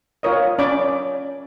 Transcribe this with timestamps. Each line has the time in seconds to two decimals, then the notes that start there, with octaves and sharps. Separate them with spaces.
0.23 F4 A#4 C#5 D#5 D#6
0.59 C#4 D5 D6